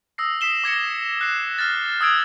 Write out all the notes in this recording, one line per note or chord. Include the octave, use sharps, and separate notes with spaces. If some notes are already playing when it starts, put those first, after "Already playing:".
D#6 E6 A#6 C7
D#6 B6 C7 E7 G7
D6 G#6 A#6 C#7
F#6 C7
F6 A6
D#6 E6 G#6 D7